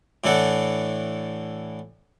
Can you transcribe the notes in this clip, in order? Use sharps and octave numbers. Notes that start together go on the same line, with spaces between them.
A2 E3 D4 A4 F#5